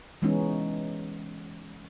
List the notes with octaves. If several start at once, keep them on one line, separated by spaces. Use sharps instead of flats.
E3 G#3 B3 C#4 D#4